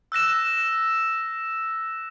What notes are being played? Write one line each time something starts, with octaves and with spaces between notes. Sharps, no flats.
E6 F#6 A#6 E7